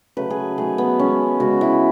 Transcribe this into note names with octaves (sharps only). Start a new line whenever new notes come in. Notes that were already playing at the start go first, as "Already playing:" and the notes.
C#3 F#3 A3 B4
G#4
D#3 F#3 A3 G#4
B3
D#3 G#3 C#4
C#3 G#3 F#4
E4